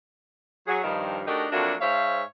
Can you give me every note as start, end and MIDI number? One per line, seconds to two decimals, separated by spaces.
0.68 0.80 54
0.68 0.80 68
0.83 1.22 43
0.83 1.22 51
0.83 1.22 53
1.27 1.47 57
1.27 1.47 62
1.27 1.47 63
1.27 1.47 66
1.27 1.47 67
1.27 1.47 70
1.52 1.75 41
1.52 1.75 54
1.52 1.75 57
1.52 1.75 58
1.52 1.75 62
1.52 1.75 66
1.81 2.23 44
1.81 2.23 72
1.81 2.23 73
1.81 2.23 76
1.81 2.23 77